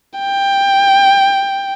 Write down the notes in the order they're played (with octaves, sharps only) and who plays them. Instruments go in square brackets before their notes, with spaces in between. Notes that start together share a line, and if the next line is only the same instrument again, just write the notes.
[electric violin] G5